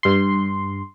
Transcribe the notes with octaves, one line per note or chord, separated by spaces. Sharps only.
G2 C6